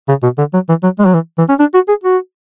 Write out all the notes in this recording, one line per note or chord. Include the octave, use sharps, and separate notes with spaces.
C#3
B2
D3
F#3
E3
F#3
G#3
F#3
E3
E3
C#4
D4
F#4
G#4
F#4